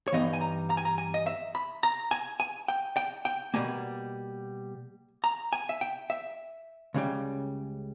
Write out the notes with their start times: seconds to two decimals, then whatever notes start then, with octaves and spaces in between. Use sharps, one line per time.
0.08 C#5
0.12 G2 E3 G3 B3 D#4 D#5
0.33 G#5
0.41 A#5
0.70 A#5
0.77 G#5
0.85 A#5
0.98 G#5
1.14 D#5
1.27 E5
1.55 B5
1.83 A#5
2.11 G#5
2.40 G#5
2.68 G5
2.97 G5
3.25 G5
3.54 B2 G3 A#3 G#5
5.24 A#5
5.53 G#5
5.69 E5
5.81 G5
6.10 E5
6.94 C#2 C#3 G3